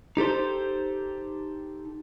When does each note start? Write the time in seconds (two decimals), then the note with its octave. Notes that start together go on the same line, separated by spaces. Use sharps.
0.17 D#4 G4 A4 C5